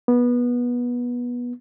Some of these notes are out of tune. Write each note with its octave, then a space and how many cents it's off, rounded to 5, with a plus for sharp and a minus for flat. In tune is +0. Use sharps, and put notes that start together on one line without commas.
B3 -20